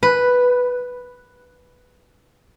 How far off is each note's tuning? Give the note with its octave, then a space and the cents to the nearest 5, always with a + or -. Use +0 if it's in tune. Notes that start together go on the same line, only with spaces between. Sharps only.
B4 +0